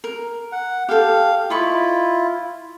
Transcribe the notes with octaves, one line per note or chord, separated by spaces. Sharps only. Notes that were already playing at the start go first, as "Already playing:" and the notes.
A#4
F#5
G4 A4 F5
E4 F4 D#5 B5 C#6